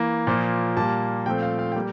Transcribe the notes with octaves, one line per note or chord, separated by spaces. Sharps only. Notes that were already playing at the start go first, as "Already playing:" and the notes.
Already playing: E3 A#3
A#2 F3 A#3
A#2 G3 A#3 A5
A#2 F3 A3 C4 G5
F5
F5
G3 A#3 G5